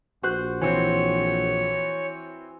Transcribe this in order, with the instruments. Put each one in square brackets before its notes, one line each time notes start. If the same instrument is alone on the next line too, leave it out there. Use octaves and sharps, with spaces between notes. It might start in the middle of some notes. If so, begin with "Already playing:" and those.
[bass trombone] A#1 [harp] F#4 C5 F#6
[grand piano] E3 C4 [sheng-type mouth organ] C#5